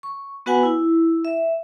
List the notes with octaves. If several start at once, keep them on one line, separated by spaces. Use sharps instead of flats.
C#6
B3 F#4 B4 F#5 G#5
E4
E5